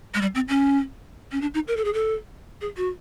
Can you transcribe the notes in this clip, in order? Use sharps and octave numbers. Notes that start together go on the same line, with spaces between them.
G#3
G3
C4
C#4
C#4
D4
D#4
A#4
A4
G#4
A4
G#4
F#4